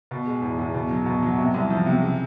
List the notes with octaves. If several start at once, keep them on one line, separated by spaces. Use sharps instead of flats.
B2
G#3
E2
E2
B2
F#3
B2
F#3
C3
C2
F3
C3
C#3